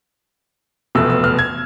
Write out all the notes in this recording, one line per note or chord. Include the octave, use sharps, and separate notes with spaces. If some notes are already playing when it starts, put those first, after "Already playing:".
F1 E2 B2 A3 E6
E6
F6
G#6